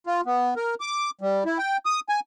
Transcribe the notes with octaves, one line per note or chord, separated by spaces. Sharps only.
F4
B3
A#4
D6
G3
E4
G5
D#6
G#5